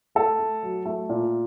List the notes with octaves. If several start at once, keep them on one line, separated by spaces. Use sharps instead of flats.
A3 A4
A3
F#3
A3
A#2